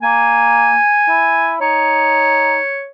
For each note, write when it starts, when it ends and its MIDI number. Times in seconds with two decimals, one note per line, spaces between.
0.03 0.77 58
0.03 1.54 80
1.09 1.57 64
1.61 2.57 63
1.61 2.91 73